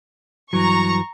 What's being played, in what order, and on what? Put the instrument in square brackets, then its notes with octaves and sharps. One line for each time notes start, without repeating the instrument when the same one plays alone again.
[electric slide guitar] G2 E3 F#3 [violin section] A#5 C#6